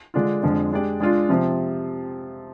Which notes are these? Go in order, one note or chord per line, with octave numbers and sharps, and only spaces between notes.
D3 G#3 D4 F4
F2 D3 F3 G#3 D4
G#3 D4 G4 D5
G#3 D4 F4
C3 F3 C4